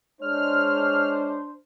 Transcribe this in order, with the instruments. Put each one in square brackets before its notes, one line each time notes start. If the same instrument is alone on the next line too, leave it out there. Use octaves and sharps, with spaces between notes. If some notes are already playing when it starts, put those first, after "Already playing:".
[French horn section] G#3 C#5 [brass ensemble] D4 C5 [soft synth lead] F6